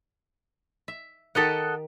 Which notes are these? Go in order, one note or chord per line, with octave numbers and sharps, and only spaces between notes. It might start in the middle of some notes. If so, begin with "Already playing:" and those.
E5
D#3 G4 A4 D#5 F#5